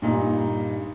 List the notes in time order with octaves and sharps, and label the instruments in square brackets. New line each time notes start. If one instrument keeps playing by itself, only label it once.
[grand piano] G2 A#2 D#4